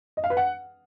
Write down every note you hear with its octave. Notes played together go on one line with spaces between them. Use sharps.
D#5
F5
B4
F#5